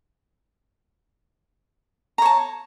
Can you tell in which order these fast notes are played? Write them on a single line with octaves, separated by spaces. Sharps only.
A#5 C#5 A5